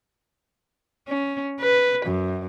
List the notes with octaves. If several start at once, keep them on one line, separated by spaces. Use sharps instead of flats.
C#4
B4
F#2